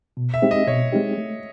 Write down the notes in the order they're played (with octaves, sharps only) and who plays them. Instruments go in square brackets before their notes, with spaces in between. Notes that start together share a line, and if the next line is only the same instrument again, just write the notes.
[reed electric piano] B2
[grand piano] E5
[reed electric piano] G#3 C4 D#4 G4
[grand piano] D#5
[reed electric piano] B2 [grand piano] C#5
[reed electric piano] G#3 C4 D#4 G4
A3